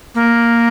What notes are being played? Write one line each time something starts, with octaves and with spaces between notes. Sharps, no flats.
A#3